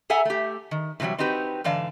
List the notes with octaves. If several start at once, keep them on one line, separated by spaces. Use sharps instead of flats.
G#4 A4 E5 F#5 G#5 A#5
A3 G4
D#3
A2 C3 E3 F#3 G3
C4 D#4 F#4 G4 B4
G#2 D3 E3 D5 F5 A5